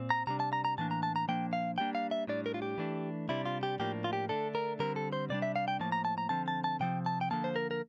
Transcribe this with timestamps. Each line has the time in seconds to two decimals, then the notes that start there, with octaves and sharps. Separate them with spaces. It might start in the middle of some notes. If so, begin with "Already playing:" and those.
Already playing: A#2 C4
0.10 A#5
0.27 C3 G3 D4 A#5
0.40 A5
0.53 A#5
0.65 A#5
0.78 A2 E3 A#3 D4 A5
0.91 A#5
1.03 A5
1.16 A#5
1.28 A#2 F3 A#3 D4 G5
1.53 F5
1.78 A2 G3 A#3 D4 G5
1.95 F5
2.11 E5
2.27 A2 G3 D4 D5
2.46 A#4
2.54 F4
2.62 G4
2.78 E3 A3 D4
3.29 C3 G3 D4 E4
3.45 F4
3.63 G4
3.79 A2 F3 A#3 D4 G4
4.04 F4
4.13 G4
4.29 D3 A3 D4 A4
4.55 A#4
4.79 D3 G3 C4 A#4
4.96 A4
5.13 C5
5.29 C3 G3 D4 D5
5.42 E5
5.56 F5
5.68 G5
5.80 A2 F3 A#3 A5
5.92 A#5
6.05 A5
6.18 A#5
6.29 D3 F3 C4 A5
6.48 A5
6.64 A5
6.80 C3 F3 C4 G5
7.06 A5
7.21 G5
7.31 D3 F3 A#3 A5
7.44 C5
7.56 A#4
7.71 A#4